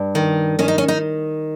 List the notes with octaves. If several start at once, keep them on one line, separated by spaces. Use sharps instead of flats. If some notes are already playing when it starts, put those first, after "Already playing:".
Already playing: G2
D#3
D#3 C#4
D#4
C#4
D#4